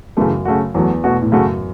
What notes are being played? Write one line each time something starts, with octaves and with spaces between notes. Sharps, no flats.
F#2 C#3 E3 A3
C#3 A3 F#4
E2 F#3 A3 F#4
B2 A3 F#4
A2
F#2 C#3 A3 F#4